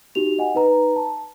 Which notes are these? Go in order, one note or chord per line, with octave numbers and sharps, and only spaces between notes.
D#4 F#4 G4 F7
D#5 F#5 G#5
D#4 B4 A#5
A5